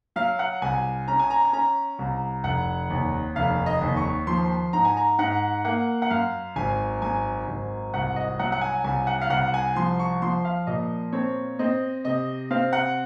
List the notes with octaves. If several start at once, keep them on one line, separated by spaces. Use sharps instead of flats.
F#3 F5
F#5
C2 G#5
C#4 A#5
G#5
A#5
G#5
C#4 A#5
C2
F1 F#5
D#2
F1 F5
D#5
D#2
C#6
F3 C6
G#2 A#5
G#5
A#5
G#2 F#5
A#3 F#5
F#5
F#2 F5
G#1 G#5
F#2 G#5
G#1
C2 F#5
D#5
F#3 F#5
F#5
G#5
C2 G#5
F#5
F5
C2 F#5
G#5
F3 C6
C#6
F3 C6
F5
A#2 D#5
C4 C#5
C4 D#5
C3 D#5
C4 F5
F#5